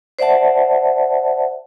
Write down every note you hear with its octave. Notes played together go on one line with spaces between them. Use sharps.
C5 D5 E5 F#5 A5